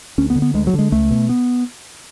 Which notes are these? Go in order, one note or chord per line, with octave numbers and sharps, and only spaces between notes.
D2 C#4
B3
D3
B3
D2 G#3
F#3
D3
G#3
C#2 A3
B2
B3